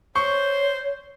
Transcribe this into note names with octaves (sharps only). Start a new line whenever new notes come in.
C5 C#5 C#6